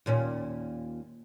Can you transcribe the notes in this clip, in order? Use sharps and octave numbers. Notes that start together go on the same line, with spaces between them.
D#2 A#2 C#4